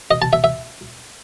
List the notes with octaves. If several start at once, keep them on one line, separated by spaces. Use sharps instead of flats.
D#5
A5
E5
E5